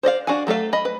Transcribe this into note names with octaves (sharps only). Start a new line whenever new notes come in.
C5 D5 D#5 F5
D4 F#4 F5 F#5 G#5
F#3 A3 A4 F5
D#5 B5
B4